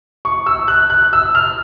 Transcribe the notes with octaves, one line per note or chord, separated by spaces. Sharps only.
C#6
E6
F#6
F#6
E6
F6